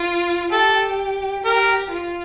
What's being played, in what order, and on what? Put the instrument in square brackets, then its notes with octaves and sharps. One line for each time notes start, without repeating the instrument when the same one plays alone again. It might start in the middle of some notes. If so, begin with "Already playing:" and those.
Already playing: [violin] F4
[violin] G4 [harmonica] A4
[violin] G4 [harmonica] A#4
[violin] F4